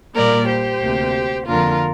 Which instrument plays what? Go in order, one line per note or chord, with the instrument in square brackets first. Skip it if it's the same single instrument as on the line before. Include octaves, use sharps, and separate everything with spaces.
[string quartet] A#2 G3 A#3 A#4 D5
G4 C5
D2 C3 A#3
F2 D3 A#3 F4 A#4